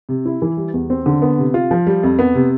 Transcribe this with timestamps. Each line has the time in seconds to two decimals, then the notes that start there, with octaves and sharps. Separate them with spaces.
0.09 C3
0.26 E4
0.42 E3
0.57 G3
0.74 E2
0.90 C4
1.06 D3
1.22 B3
1.38 C3
1.54 F4
1.71 F3
1.87 G3
2.03 F2
2.19 B3
2.35 C3